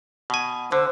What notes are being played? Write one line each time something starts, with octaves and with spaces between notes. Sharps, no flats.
B2 G#5
D3 C5